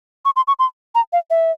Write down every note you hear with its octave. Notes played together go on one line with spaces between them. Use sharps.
C#6
C6
C#6
C6
A#5
F5
E5